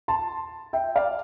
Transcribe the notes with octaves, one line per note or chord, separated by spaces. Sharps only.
A5 C6
E5 G5
D5 F5